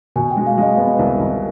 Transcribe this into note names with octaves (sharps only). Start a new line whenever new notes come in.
B2 G#5
G5
G#3
F5
G#3 D#5
B3 F5
D#5
C2
C2